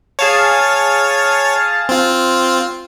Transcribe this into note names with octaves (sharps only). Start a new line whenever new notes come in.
G#4 C#5 F5 A5
C4 F4